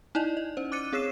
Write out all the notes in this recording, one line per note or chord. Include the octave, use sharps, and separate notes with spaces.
D#4 E4 D5 D#5
D#5
C#4 C5
D6 F#6 A6 C#7 D#7
C4 G#4 C#5 E6 C7 E7